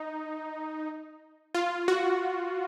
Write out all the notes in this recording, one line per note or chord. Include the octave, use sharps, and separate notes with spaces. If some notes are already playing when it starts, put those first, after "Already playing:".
Already playing: D#4
F4
F#4